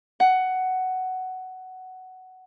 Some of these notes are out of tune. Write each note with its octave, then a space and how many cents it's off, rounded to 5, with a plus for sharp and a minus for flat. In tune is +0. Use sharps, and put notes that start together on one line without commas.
F#5 +10